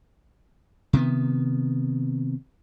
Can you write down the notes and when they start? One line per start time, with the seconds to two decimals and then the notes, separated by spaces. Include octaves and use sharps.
0.93 C3 D#3 B3